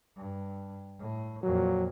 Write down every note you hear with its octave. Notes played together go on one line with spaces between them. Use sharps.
G2
A2
F2 A#2 F#3